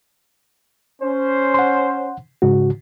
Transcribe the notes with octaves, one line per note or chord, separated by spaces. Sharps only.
C#4 C5
F#5 C6
G#2 C#3 F#4